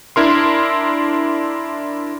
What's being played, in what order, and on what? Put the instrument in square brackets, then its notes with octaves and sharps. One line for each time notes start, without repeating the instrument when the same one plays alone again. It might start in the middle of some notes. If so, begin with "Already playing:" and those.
[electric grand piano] D4 E4 A#4 C6